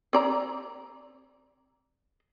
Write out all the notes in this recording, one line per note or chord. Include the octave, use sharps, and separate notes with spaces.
C4 D5 A#5